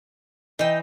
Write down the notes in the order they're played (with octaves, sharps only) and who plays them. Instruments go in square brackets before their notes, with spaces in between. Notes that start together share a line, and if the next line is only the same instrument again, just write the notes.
[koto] E3 [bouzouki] D#4 G5 [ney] D#5